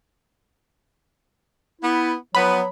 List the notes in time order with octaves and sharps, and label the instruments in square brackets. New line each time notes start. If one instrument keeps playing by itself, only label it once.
[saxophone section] B3 [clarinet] E4
[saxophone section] F3 B3 [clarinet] F#3 [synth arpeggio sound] B5